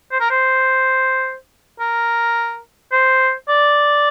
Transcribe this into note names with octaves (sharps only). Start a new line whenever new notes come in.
C5
A#4
C5
A#4
C5
D5